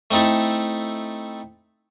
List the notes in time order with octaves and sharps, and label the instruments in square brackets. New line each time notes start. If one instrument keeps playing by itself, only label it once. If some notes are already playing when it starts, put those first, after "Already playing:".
[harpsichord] A3 C4 D#4 E4 A4